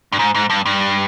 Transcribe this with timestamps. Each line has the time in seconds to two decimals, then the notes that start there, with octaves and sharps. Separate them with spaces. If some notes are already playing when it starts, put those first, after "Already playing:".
0.12 G2
0.19 G#2
0.35 G#2
0.50 G2
0.66 G2